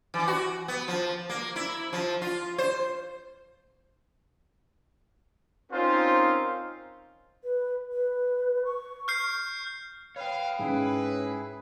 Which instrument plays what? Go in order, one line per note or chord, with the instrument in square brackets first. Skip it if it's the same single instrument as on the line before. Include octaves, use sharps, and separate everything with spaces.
[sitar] E3
F#4
B3
F3
A#3
E4
F3
F4
C5
[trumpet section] C4 C#4 D#4 F4 A#4 C5
[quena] B4
B4
C#6
[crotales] F6 G6 C7
[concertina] B4 [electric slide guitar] C#5 G5 [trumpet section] F5
[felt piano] G#2 C#4 [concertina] E4 G#4 [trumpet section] B4